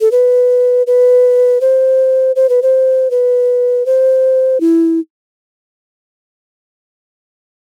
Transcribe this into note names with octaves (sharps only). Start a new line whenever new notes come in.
A4
B4
B4
C5
C5
B4
C5
B4
C5
E4